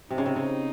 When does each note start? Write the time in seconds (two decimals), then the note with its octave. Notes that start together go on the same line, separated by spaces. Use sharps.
0.11 C3 C4 D#4
0.18 C#3
0.26 C3
0.36 C#3